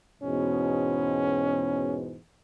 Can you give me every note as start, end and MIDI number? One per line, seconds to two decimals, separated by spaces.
0.23 2.16 40
0.23 2.16 44
0.23 2.16 47
0.23 1.99 61